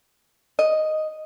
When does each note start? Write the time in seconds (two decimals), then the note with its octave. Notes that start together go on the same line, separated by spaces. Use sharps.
0.59 D#5